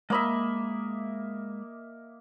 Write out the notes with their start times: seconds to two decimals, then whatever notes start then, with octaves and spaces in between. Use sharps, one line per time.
0.10 G#3 A#3 D#5 E5 B5